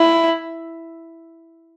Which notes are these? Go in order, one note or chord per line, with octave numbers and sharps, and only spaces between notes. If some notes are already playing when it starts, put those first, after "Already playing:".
Already playing: E4